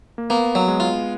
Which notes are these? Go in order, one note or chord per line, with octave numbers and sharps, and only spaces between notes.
A#3
A#3 B3
F#3
G#3
F4